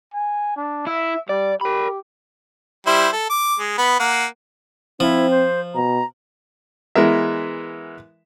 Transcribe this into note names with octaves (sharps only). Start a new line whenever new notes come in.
G#5
D4
E4 E5
G3 D5
G4 A#4 B5
G3 E4 C5
A4
D6
G#3
B3 B5
A#3 F#5
F3 C4 E4
C5
B2 A#5
E3 G#3 B3 A#4 E5